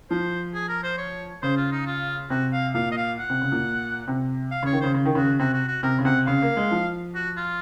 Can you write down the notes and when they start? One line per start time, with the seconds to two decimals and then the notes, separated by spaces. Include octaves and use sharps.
0.10 F3 C5
0.55 G#4
0.69 A#4
0.84 C5
0.98 C#5
1.43 C#3 C5
1.57 F4
1.72 D#4
1.86 F4
2.30 C3 F#4
2.53 F5
2.74 A#2 F5
2.92 D#5
2.97 F5
3.19 F#5
3.30 C3
3.41 C#3
3.52 A#2
4.08 C3
4.52 F5
4.63 C#3 C#5
4.72 D#3
4.81 C#3 C5
4.95 C#3
5.05 D#3
5.15 C#3 F#4
5.39 C3 F#4
5.54 F#4
5.68 F#4
5.83 C3 A#4
5.99 C#3
6.05 C3 F#5
6.27 C#3 F5
6.42 A#3
6.57 G#3
6.71 F3
7.15 F#4
7.37 F4